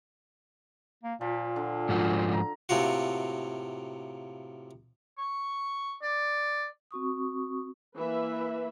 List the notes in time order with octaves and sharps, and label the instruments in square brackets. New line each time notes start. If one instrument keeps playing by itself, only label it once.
[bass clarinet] A#3
[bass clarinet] A#2 [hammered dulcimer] F3
[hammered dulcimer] D3
[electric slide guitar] G#2 F3 F#4
[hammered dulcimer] A#5
[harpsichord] A2 C3 A#3 F4 F#4
[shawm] C#6
D5
[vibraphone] C4 F#4 C#6 D#6
[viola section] E3 A#3 B4 E5 B5